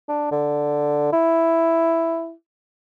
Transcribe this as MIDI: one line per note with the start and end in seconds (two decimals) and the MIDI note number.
0.09 0.29 62
0.31 1.12 50
1.13 2.32 64